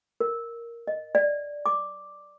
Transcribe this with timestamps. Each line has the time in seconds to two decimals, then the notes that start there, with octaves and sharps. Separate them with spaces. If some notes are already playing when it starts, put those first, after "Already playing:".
0.20 A#4
0.88 D#5
1.15 D5
1.66 D6